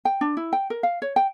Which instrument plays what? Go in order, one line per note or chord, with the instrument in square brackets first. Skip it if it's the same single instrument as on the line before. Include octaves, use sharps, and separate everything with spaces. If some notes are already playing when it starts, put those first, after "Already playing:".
[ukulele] G5
D4
E4
G5
A#4
F5
C#5
G5